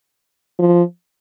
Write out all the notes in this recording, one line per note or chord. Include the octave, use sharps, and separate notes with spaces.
F3